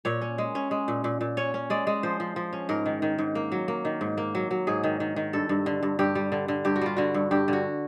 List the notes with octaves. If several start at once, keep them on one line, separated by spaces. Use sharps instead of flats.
A#2 C#5
C#4
G#3
C#4
G#3
A#2
A#2
A#2
C#4 C#5
C#4
G#3 D5
G#3
F3 C5
F3
F3
C#4
G#2 A#4
D#3
D#3
G#2
A#3
F#3
A#3
D#3
G#2
A#3
F#3
F#3
G#2 G#4
D#3
D#3
D#3
G2 A4
G2
D3
G2
G2 G4
G3
D3
D3
G2 G4
F#4
G3 F4
D3 F#4
G2
G2 G4
D3 F#4